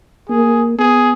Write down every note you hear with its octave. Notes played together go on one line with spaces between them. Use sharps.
A#3 G#4
B3 G#4